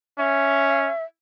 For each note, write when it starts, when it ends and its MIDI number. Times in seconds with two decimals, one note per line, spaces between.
0.18 0.90 61
0.18 1.04 76